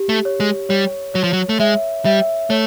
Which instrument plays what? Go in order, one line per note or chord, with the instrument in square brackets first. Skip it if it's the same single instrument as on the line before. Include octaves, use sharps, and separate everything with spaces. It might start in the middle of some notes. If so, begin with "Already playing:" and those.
Already playing: [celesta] G4
[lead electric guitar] A3
[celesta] C#5
[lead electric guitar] G#3
[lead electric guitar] G3 [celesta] C#5
[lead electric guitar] F#3 [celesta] C#5
[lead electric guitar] F3
F#3
A3
[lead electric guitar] G#3 [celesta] E5
[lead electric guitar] G3 [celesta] E5
[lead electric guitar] A3 [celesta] C#5